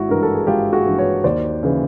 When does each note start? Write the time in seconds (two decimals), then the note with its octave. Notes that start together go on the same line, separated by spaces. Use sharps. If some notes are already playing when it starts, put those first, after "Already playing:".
Already playing: G#1 E4 F#4
0.09 G2 E3 A#4
0.23 A4
0.34 G#4
0.47 G#1 F4 G4
0.73 F#4 G#4
0.86 G2 E3
0.99 B4 C#5
1.24 D#2 C5 D5
1.63 C#3 E3